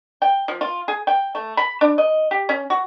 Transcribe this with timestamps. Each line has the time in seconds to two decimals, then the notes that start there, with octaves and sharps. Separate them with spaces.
0.22 G5
0.48 F3
0.61 F4
0.88 G#4
1.07 G5
1.35 A3
1.57 B5
1.81 D4
1.98 D#5
2.31 G4
2.49 C#4
2.70 F#4